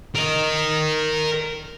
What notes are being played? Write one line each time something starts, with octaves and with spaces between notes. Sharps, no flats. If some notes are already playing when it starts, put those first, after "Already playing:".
A#4 D#5